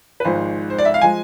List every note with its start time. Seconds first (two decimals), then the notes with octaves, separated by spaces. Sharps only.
0.20 B4
0.24 G#1 G#2 F3 G#3 C5
0.70 C5
0.78 D5
0.85 E5
0.94 F5
1.01 F3 G#3 G#5